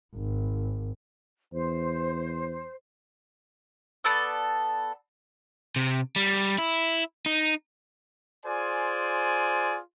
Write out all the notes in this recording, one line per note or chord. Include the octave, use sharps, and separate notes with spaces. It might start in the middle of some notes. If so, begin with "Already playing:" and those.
G#1
E2 C5
B3 A4 D5 E6
C3
G3
E4
D#4
F4 G#4 C5 D5 G#5